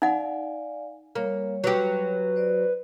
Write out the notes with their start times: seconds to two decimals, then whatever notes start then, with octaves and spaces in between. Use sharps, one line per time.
0.02 D#4 D5 F5 F#5 G#5
1.15 G3 A#3 C#5
1.64 F#3 G4 B4
2.36 C5 D5